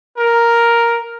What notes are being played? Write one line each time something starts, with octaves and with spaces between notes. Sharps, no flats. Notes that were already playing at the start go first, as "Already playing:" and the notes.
A#4